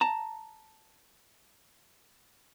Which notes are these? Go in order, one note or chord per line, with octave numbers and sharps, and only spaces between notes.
A5 A#5